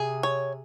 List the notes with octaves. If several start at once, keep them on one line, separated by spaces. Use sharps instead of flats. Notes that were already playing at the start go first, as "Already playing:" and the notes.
Already playing: C3 G#4
C#5